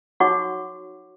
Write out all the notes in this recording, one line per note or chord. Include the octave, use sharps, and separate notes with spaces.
D#4 F#4 C#5 F#5 C#6 D6